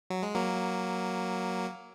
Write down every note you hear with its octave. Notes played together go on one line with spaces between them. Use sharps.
F#3
G#3
F#3 A#3